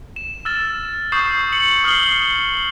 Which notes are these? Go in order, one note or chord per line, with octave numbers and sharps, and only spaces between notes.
E7
E6 F6 A6 E7
C#6 D#6 G6 C7 E7
C#7 F#7
D#6 F6 C7 F#7 G7